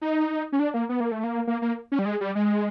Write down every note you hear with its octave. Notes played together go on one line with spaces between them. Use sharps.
D#4
C#4
D4
A#3
B3
A#3
A3
A#3
A#3
A#3
C#4
G3
G#3
G3
G#3